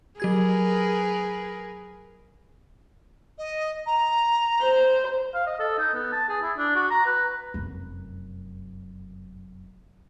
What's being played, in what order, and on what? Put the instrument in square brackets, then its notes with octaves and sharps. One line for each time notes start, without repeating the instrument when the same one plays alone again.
[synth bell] F#3 G4 G#6 [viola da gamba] G#4 A#4 B4
[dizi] D#5
A#5
[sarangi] C5
[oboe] F5
D#5
A4
D#4
B3
A5
G#4
E4
D4
F#4
A#5
B4
[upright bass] F1 F#2